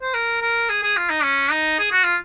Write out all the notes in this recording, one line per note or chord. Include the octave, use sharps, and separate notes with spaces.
C5
A#4
A#4
G#4
G#4
F4
D#4
C#4
D#4
G#4
F#4
F4